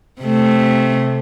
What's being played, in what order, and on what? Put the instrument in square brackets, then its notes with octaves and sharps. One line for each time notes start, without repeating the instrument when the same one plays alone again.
[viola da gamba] C3 A3